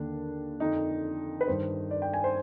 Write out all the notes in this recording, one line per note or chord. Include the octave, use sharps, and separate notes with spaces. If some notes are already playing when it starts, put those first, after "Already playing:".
Already playing: D#2 D3 D4
F2 D3 D#4
B4
G2 D#3 C5
D5
G5
G#5
C5